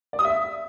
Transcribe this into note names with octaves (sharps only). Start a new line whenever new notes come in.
D5
D#6
E5